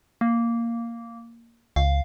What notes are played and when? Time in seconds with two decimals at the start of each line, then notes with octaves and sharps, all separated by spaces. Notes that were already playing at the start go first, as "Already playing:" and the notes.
0.21 A#3
1.76 C#2 F5